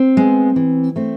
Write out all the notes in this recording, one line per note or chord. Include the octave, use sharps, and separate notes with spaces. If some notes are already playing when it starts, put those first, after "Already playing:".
Already playing: C4
G#3 B3
E3
A3 C4